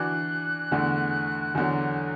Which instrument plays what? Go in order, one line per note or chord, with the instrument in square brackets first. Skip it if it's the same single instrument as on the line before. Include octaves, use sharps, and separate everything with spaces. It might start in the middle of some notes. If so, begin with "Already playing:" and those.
Already playing: [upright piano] E3 D4 F#4 [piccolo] F#6
[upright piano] E2 D3 A3
E2 D3 F#3